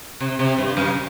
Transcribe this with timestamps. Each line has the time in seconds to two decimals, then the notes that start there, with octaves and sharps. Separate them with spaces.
0.21 C3
0.39 C3
0.58 G2
0.77 F#2